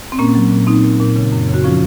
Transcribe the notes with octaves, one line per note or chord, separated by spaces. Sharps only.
C4
A#2 A#3 C#4
F#3
A#2
A#2 C4 D#4
A#2
A#2
C#3
F#2
C#3
F#4
F3 C#4 F4